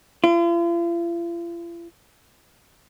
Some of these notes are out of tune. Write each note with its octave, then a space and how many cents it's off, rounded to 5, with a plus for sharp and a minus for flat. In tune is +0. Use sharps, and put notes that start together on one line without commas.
F4 -45